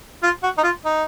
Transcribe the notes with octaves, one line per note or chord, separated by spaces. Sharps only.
F4
F#4
D#4
F4
D#4